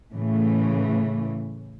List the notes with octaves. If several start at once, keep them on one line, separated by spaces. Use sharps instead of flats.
A2 C#3 E3 A3